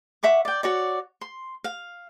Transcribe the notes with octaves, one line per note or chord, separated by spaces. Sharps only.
E5 F#5 C#6 D6
D5 G5
F#4 C#5 D5
C6
F5